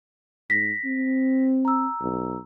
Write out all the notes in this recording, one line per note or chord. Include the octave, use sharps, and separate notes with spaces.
G#2 A#6 B6
C4
A#5 E6
B1